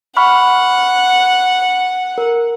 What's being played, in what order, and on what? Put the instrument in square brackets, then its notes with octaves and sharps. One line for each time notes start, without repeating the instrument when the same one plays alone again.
[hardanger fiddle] F#5 [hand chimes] B5 C#6 F6
[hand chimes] A#4